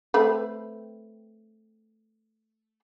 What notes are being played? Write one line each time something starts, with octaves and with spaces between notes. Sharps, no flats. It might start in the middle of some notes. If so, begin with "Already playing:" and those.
A3 C4 B4